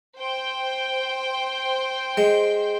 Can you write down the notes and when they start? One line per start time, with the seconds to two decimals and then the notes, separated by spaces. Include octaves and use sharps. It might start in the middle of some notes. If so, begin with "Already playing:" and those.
0.17 C5 G5
2.17 G#3